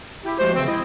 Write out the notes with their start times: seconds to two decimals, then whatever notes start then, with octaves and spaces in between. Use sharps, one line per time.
0.24 E4 G4
0.38 F3 G#3 A3 F#4 G4 C5
0.55 C#3 E3 F3 A3 C4
0.67 G#3 C4 E4 D#5